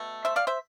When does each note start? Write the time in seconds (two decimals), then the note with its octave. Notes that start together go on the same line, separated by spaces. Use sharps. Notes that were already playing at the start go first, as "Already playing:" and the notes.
Already playing: B2 A3
0.25 C5 E5
0.36 D5 F5
0.47 C5 E5